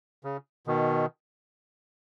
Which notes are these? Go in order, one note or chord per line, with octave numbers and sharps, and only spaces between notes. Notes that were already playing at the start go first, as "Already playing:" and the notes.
C#3
B2 D#3